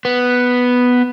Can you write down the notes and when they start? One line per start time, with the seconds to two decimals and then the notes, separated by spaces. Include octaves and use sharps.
0.05 B3